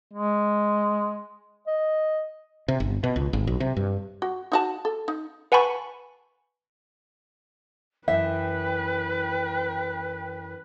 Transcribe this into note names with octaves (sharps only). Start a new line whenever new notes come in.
G#3
D#5
C3
G1
B2
C#2
G#1
B1
C3
G2
F#4
D#4 F#4 A5
A4
D#4
B4 F#5 G#5 A5 B5 C#6
F#2 E3 B4 E5 G5